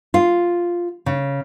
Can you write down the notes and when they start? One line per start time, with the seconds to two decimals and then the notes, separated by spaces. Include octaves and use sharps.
0.14 F4
1.06 C#3